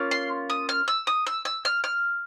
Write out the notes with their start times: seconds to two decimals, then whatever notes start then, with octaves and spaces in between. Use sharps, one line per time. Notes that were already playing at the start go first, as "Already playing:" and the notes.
Already playing: A#3 C#4 F4
0.11 C6
0.50 D#6
0.69 F6
0.88 E6
1.07 D#6
1.27 E6
1.45 E6
1.65 F6
1.84 F6